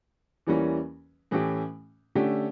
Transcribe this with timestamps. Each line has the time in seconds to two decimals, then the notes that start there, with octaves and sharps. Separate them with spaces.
0.47 E2 E3 G3 A#3 C#4
1.31 A2 E3 A3 C#4 G4
2.15 D3 A3 C#4 G4